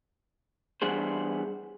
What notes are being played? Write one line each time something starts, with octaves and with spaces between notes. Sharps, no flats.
E3 G3 B3 D4 G#4 C5